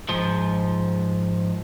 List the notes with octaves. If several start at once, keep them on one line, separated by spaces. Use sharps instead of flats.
G#2 F3